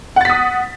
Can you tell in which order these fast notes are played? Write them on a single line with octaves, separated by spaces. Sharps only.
F#5 A6 B6 D#6